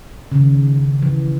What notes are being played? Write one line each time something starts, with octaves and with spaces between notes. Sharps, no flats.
C#3
D#3
E3